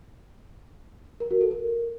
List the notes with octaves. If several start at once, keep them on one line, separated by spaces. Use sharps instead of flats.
A#4
F#4
A4
A#4